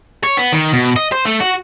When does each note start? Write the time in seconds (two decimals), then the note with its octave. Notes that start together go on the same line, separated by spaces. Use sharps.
0.24 C#5
0.37 B3
0.53 D#3
0.73 B2
0.96 D#5
1.12 C5
1.26 A3
1.41 F#4